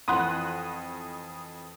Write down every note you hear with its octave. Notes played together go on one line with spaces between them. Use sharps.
F2 E3 F#5 B5 C6 D#6 F#6